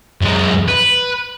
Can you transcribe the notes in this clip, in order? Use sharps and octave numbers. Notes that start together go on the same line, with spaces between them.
F#2 G#3
B4